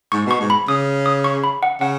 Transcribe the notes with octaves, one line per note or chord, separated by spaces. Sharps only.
G#2 C#6
B2 C#6
G#2
B5
C#3 D#6
D#6
C#6
B5
F#5
C#3 F#5